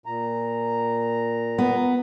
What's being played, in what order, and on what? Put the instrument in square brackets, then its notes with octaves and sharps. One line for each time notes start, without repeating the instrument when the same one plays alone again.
[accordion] A#2 A#5
[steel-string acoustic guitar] B3